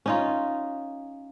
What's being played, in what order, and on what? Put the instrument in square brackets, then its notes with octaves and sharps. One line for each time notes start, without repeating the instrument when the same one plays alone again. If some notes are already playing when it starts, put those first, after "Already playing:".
[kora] C#4 D#4 F4